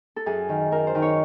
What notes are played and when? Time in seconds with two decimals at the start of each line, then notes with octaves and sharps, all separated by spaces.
0.16 A4
0.26 F#2 G#4
0.49 D#3
0.71 F#2 A#4
0.87 C5
0.95 D#3
1.02 C#5